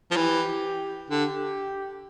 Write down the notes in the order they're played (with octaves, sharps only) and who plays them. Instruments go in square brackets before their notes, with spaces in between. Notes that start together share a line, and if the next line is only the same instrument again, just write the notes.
[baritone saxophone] F3
[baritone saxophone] E3 [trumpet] G4
[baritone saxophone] D3 [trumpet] G4